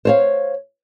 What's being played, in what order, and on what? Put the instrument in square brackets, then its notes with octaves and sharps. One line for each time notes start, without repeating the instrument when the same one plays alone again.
[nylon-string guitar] C5 C#5 F5